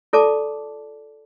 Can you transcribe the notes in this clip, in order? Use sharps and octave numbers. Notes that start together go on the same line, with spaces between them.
F4 A4 D5 A5 D6